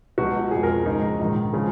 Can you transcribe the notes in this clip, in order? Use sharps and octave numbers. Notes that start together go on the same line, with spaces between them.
C#2 B2 F#3 F#4
F2 F3 G#3 G#4
A#4
C#2 C#3 F3 G#3 D#4
A#1 G#2 D#3
C#3 F3 G#3